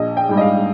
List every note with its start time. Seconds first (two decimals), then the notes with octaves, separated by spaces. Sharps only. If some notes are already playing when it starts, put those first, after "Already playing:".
Already playing: A#1 D#5
0.17 G5
0.29 G#2 G3
0.37 D#5
0.41 F5